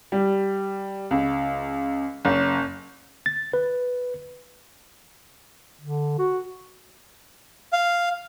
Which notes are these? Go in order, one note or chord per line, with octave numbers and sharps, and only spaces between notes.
G3
C#2
F#1
A6
B4
D3
F#4
F5